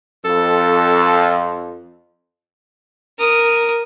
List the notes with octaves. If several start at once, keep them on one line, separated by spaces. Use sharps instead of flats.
F2 A4
A#4 D#6